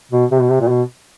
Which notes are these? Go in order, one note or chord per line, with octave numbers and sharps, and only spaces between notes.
B2
C3
B2
C3
A#2
B2